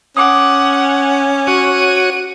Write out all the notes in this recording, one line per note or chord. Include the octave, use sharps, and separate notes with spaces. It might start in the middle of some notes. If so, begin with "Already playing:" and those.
C#4 F#5 D6 D#6
F#4 C#5 D#7